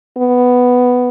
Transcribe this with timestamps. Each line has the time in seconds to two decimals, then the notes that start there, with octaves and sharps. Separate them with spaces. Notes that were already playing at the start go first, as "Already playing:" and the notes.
0.17 B3